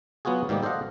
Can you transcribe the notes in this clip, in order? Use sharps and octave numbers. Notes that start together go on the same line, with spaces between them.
F#3 B3 F4 F#4 G#4
G#2 D#3 G3 A#3 G4
A4 C5 D5 D#5 F5 F#5